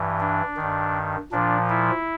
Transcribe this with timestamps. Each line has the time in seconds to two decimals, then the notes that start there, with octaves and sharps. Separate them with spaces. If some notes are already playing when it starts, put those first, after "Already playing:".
Already playing: G2 E3
0.20 D4
0.57 D#3
0.62 G2
1.32 A#2 F3 D4
1.70 E4